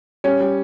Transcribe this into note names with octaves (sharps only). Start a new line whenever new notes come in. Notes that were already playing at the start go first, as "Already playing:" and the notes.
G3 C#4 C#5
G3